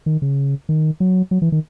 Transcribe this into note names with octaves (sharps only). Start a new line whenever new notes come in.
D#3
C#3
D#3
F#3
F#3
E3
D#3